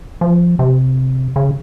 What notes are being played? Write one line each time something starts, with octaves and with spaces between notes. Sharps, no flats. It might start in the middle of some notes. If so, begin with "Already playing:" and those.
F3
C3
C#3